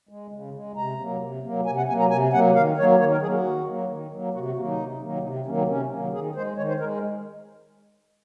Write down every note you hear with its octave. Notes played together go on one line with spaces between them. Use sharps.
G#3
C#3
G#3
C3 A#5
F#3 A#3
C3
F#3 A#3
C3 G#5
F#5
F#3 A#3 G#5
A#5
C3 G#5
F#3 A#3 F#5
D#3 F5
F#3 A#3 C#5
D#3 C#5
A#4
F#3 A#3 G#4
F#4
D#3
F#3 A#3
D#3
F#3 A#3
C3 F#4
F#4
D#3 F#3 A#3 F#4
D#4
C3
D#3 F#3 A#3
C3 D#4
C4
D#3 F#3 A#3 C#4
C4
C3 C#4
D#3 F#3 A#3
D#3 G#4
G#3 C5
D#3 C#5
C5
G#3 A#4